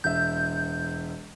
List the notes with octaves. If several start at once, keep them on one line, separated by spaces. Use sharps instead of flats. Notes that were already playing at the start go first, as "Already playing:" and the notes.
E1 E5 G6